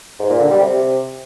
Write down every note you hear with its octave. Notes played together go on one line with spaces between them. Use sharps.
G#2
A#2
D3
G3
C3